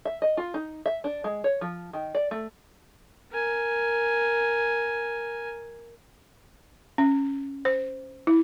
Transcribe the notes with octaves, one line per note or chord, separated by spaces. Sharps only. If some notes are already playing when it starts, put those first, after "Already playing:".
E5
D#5
F4
D#4
E5
D4
G#3
C#5
F3
D#3
D5
A3
A#4 G#5
C#4
C5
E4